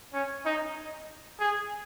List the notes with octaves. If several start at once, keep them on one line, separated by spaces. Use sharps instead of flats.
C#4
D#4
G#4